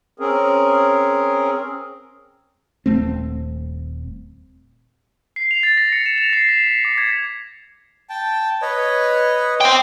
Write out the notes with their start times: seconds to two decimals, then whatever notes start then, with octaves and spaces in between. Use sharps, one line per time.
0.20 C4 C#4 G#4 A#4
2.86 D#1 A3 C4
5.36 C7
5.51 F7
5.63 A6
5.77 A#6
5.92 C#7
6.06 E7
6.18 F7
6.33 C7
6.49 B6
6.67 C7
6.85 D6
6.98 G#6
8.09 G5 A5
8.62 B4 C#5 D#5
9.61 C5 G5 C6 D6 D#6